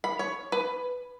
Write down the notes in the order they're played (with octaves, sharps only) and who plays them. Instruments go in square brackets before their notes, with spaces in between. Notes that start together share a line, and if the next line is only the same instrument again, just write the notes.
[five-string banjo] B5
C#5
B4